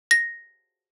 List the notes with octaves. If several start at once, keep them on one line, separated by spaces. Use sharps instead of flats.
A#6